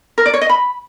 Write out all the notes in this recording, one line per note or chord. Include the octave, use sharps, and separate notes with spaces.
A#4
D5
C#5
D#5
B5